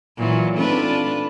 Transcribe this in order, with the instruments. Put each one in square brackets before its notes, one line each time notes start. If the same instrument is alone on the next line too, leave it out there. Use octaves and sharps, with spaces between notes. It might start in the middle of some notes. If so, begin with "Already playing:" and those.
[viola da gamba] A#2 E3 F#3
[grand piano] A3 C4 D#4 [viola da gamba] D4 F4 B4